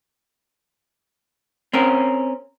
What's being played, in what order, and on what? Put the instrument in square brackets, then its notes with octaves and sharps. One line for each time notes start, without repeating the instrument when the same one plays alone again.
[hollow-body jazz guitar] C4 C#4 A#4